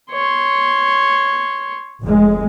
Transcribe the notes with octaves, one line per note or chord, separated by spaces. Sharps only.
C#5 C6
F1 G#3